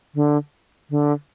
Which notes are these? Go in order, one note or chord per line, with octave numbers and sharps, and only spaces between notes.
D3
D3